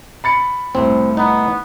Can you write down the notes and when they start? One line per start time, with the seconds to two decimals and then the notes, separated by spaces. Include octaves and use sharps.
0.24 B5 A6 C#7
0.75 C2 A2 C4
1.17 B3 D#4